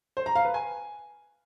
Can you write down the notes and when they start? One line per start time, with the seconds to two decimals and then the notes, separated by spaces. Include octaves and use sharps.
0.17 C5
0.26 A#5
0.35 F5
0.45 B4
0.54 G#5